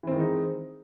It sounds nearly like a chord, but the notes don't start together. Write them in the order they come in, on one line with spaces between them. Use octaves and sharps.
E3 C4 D#3 G#3 D#4